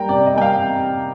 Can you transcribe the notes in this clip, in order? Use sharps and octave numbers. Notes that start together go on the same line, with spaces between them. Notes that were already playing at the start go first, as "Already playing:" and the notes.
Already playing: G3 A#3 G5 A#5
C3 D5
D#5
G3 A#3 G5
F5